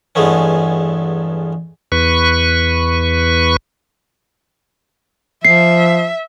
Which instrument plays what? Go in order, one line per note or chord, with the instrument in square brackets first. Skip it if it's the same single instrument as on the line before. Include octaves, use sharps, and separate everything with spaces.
[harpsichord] E2 G2 G#3 A3 B3 C#4
[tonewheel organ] E2 B4 C#6
[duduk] F3 [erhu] E5 [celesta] C7